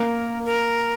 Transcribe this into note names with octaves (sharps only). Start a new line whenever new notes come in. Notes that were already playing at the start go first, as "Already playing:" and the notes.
Already playing: A#3 A#4
A#4